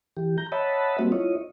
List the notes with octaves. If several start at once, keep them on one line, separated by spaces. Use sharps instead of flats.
E3 G4
A#5 G6
C#5 D#5 E5 F#5 A5 B5
G3 A#3 C4 F#4
E4 F4 C#5 D#5